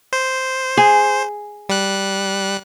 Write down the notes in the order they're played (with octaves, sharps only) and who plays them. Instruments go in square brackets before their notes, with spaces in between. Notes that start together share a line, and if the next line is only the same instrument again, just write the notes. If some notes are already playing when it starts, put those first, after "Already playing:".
[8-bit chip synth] C5
[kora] G#4
[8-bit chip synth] G3 F#6